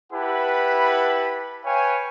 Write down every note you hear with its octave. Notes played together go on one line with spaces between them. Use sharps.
E4 G4 B4 F#5 A5 B5
B4 C#5 F5 G5 G#5